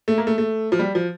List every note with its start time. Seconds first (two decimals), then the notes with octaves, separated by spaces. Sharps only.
0.08 A3
0.18 A#3
0.27 A3
0.38 A3
0.72 F3
0.79 G3
0.95 F3